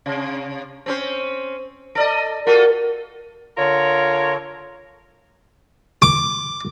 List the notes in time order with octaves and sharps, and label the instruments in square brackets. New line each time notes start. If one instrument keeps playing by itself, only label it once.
[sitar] C3
C4 C#4 C5
A4 D5 D#5
[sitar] F4 F#4 A4 [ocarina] A#4
[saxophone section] D3 F4 A#4 C#5
[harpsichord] D6